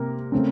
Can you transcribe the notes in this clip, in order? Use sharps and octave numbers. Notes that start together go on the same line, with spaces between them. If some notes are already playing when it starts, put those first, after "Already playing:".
Already playing: C3 A#3 A#4
C#3 A3 C4